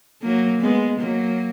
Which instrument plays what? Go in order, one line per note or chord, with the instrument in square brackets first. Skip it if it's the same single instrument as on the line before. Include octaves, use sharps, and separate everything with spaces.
[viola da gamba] F#3 A#3
G#3 B3
F#3 A#3